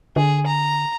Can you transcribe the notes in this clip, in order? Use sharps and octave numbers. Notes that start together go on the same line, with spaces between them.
D3 G#4
A#5